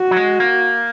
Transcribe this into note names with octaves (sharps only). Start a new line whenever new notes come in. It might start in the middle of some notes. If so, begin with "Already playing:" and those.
Already playing: F#4
F#3
G#3
A#3